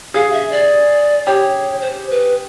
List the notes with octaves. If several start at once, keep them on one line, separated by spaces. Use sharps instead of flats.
G#4 F5
E5
D5
G4 C#5
C5
B4